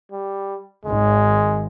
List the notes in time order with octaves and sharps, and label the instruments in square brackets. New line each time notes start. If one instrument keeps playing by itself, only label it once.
[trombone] G3
[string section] G#1 [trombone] G#3